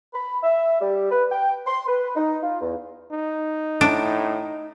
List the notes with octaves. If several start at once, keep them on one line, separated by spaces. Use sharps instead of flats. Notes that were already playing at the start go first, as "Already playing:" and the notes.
B5
E5
G3
B4
G5
C6
B4
D#4
F4
E2
D#4
A2 D4